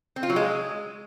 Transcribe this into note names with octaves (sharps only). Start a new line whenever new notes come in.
C4
F4
F#3
G#3